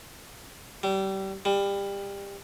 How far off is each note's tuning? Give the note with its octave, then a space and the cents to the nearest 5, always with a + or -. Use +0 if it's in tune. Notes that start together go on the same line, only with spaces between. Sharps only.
G3 -25
G3 +25